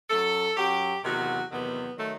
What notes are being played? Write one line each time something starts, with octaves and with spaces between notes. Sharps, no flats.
F#2 F#3 A4
F#2 F#3 G4
E2 C3 D#3 F#3 F#4
E2 C3 D#3 F#3 B3
D#3 F#3 A3